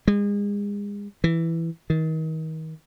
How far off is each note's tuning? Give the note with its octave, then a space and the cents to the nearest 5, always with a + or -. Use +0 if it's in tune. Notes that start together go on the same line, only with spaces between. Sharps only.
G#3 -35
E3 +5
D#3 +35